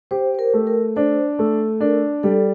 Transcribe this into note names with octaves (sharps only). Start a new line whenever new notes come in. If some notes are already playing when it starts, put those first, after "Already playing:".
G4 C5
C5
A#4
A3
A#4
D4 C5
A3
D4 A#4
G3 A4